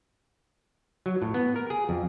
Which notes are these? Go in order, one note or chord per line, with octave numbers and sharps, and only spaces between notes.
F#3
A2
B3
A#4
G#4
F2